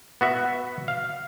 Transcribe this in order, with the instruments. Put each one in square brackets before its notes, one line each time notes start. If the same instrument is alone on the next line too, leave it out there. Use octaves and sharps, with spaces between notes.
[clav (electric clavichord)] B3 F#4 E5
F5